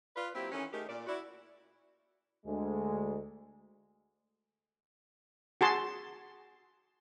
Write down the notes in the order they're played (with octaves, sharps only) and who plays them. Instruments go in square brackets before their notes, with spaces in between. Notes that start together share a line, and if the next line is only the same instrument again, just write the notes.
[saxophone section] F4 B4 D5
F#3 A#3 C4 E4 F4 G4
D#3 E3 A3 C#4
D#3 A3 D#4 G4 G#4 A#4
A#2 D5
E4 F#4 D5
[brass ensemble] D2 G#3
[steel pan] F#4 G#4 A5 C6